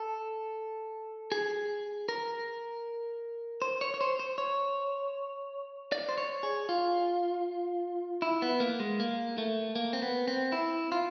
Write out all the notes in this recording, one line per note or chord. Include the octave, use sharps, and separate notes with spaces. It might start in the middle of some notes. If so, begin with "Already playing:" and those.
Already playing: A4
G#4
A#4
C5
C#5
C#5
C5
C5
C#5
D5
C5
C#5
G#4
F4
E4
B3
A#3
G#3
A#3
A3
A#3
C4
B3
C4
E4
F4